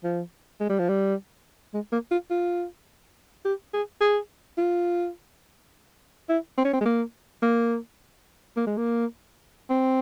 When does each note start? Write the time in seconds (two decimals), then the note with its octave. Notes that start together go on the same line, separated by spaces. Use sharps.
0.04 F3
0.60 G#3
0.69 G3
0.79 F3
0.89 G3
1.74 G#3
1.92 A#3
2.11 F4
2.30 F4
3.45 G4
3.73 G#4
4.01 G#4
4.58 F4
6.29 E4
6.58 C4
6.65 C#4
6.73 C4
6.81 G#3
6.85 A#3
7.42 A#3
8.57 A#3
8.67 G#3
8.77 A#3
9.70 C4